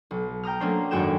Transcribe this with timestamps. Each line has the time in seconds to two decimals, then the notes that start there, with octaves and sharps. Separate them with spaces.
0.11 B1
0.43 G5 A#5 D#6 F6
0.60 F#3 A3 A#3 C#4 D4 C5
0.91 G#1 F#2 F#4 G#4 G5 E7